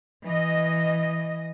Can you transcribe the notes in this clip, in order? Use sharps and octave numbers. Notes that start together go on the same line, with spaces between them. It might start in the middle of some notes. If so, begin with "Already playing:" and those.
E3 D#5